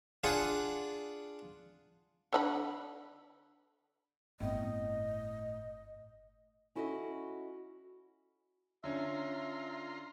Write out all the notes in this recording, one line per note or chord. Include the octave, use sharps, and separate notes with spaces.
D4 F4 G#4 F#5
D3 D#4 B5
G1 A2 B3 C4 D#5
C#4 E4 F#4 A4 C5 D#5
D3 C#4 F4 E5 A#5 C6